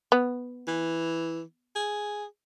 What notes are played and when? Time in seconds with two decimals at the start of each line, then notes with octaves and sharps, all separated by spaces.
0.12 B3
0.67 E3
1.75 G#4